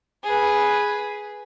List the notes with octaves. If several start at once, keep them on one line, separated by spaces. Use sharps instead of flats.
G#4 B4